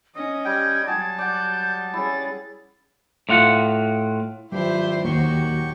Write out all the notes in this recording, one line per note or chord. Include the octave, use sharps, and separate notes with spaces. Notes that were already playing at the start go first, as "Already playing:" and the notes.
C#4 D#5 D#6
G3 G5 G#6
F#3 G3 F#4 G#4 A5
D5 F#5 G6
G3 C#4 E4 G#4 A6
A2 F4 F#5
G#1 G2 F#3 E4 F4 G4 C5
D#2 A#2 D#3 F#3 F#4 G4 C#6